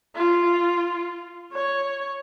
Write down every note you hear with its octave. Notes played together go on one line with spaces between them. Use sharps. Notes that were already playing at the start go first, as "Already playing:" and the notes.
F4
C#5